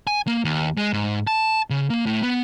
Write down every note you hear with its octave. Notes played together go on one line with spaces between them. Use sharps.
G#5
A#3
D#2
G#3
G#2
A5
C#3
A#3
A2
B3